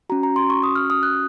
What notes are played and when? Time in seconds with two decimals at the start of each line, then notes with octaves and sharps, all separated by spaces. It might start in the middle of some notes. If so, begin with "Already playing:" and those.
0.09 C#4 F#4 A#5
0.23 A#5
0.36 C6
0.50 C#6
0.63 D#6
0.75 F6
0.90 D#6
1.03 F#6